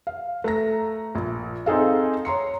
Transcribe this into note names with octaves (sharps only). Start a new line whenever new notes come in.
F5
A3 A#5 A#6
A#1
C4 D#4 G#4 A4 F5
C#5 A#5 C6 C#7